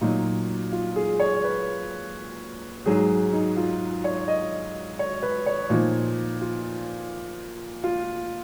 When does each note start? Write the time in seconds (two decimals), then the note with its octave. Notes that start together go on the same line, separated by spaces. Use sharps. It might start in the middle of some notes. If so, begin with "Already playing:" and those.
0.01 A#2 F#3 D#4
0.72 F4
0.96 G#4
1.20 C#5
1.44 B4
2.86 G#2 F#3 G#4
3.33 D#4
3.57 F4
4.04 C#5
4.28 D#5
4.99 C#5
5.22 B4
5.46 C#5
5.70 A#2 F3 D#4
6.41 F4
7.84 F4